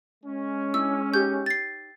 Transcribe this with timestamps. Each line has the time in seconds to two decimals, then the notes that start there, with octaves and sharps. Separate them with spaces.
0.24 G#3 C#4
0.74 D4 E4 E6
1.14 D#4 G4 C#5 G6
1.46 A6 C7